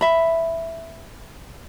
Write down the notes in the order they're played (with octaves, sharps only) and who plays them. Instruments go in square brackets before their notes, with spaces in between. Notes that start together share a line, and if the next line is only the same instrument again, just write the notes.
[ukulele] E5 B5